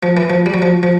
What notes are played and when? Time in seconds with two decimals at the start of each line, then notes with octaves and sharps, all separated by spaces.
0.03 F3
0.17 E3
0.30 F3
0.46 G3
0.54 F#3
0.62 F3
0.83 F3